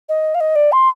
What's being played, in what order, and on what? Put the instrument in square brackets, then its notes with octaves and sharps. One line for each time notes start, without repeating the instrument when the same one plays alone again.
[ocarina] D#5
F5
D#5
D5
C6